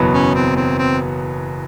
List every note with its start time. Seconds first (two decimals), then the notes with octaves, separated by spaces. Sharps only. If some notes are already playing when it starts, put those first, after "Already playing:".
Already playing: F#1 E2 B2 F#3 B3
0.13 C#4
0.35 C4
0.57 C4
0.79 C4